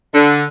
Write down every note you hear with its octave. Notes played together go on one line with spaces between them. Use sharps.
D3